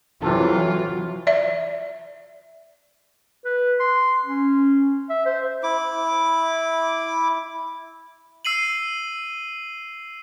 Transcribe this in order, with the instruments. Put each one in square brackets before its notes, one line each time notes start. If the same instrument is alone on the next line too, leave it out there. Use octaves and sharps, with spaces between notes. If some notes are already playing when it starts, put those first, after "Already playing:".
[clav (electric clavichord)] C3 A4 [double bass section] E3 F#3 [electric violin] F4
[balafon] D5 E5
[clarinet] B4
C6
C#4
E5
C5
[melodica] E4 D6
[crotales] E6 C7 D#7 F#7